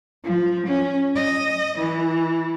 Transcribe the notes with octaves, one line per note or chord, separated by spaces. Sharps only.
F3
C#4
D#5
E3